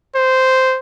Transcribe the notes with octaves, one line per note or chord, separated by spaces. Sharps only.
C5